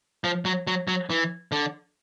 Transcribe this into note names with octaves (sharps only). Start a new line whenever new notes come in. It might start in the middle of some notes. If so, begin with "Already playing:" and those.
F3
F#3
F#3
F#3
E3
D3